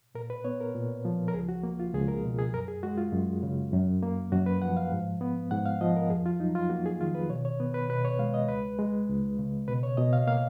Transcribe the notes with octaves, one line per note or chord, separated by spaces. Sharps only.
A#2 A#4
B4
B3 C#5
A#4
A#2
F3
A#4
C#2 G#4
F#4
A#3
F4
C#2 G#4
A#4
B2
G#4
F#2 A#4
G#4
G#3 F#4
F4
F#2
C#3
F#2
A#3
F#2 F#4
B4
F3 F#5
F5
G#2
B3
G#2 F#5
F5
F3 D#5
A#4
F2 G#4
F4
F#3 D#4
F4
A#3 F#4
G#4
D#3 F4
B4
B2 C#5
C#5
B3 B4
B4
B2 B4
C#5
G#3 F5
D#5
C#2 B4
G#3
C#2
C#3
B2 B4
C#5
B2 D#5
F5
A#3 F5